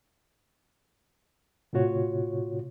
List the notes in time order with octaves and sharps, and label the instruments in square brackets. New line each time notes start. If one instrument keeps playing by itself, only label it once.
[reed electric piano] A2 C3 F4 F#4 C#5